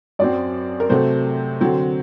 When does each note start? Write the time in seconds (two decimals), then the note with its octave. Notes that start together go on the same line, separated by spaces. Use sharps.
0.19 F#2 F#3 C4 D5
0.80 A#4
0.89 C3 F#3 A3 C5
1.61 D3 F#3 C4